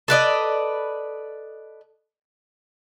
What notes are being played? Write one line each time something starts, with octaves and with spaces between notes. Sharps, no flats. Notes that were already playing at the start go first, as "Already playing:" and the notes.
A4 B4 D5 D#5